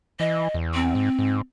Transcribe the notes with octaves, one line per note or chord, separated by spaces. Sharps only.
E3 D#5
E2
C4
G#2
G#2